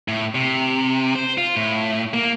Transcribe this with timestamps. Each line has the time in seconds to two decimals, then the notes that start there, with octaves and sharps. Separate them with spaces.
0.08 A2
0.35 C3
1.16 C5
1.38 F4
1.57 A2
2.14 A#3